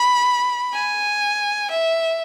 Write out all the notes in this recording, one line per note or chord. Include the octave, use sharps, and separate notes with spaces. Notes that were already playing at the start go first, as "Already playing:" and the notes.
Already playing: B5
G#5
E5